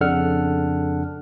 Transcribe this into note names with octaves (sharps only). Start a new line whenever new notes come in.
F2 C#3 D4 A4 F#5 F6